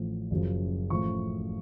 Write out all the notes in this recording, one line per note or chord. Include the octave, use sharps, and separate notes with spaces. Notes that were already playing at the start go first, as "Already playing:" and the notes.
Already playing: A1 A2 F3
F#1 F#2 F3
A1 A2 F3 C#6